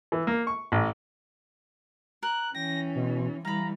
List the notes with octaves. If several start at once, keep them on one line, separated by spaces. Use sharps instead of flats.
E3
A#3
C#6
A1
A#4 F#6
E3 C#4 G5 A#6
B2
E3 G3 F5 A#5 B5